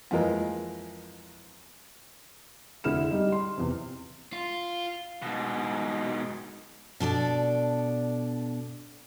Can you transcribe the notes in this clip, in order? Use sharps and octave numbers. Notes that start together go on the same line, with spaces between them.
F2 E3 G#3 A#4
F1 D3 E4 G#4 F6 E7
G3 D#4 D#5
C6
E2 C3
F4
G#2 B2
B2 D4 A4 D5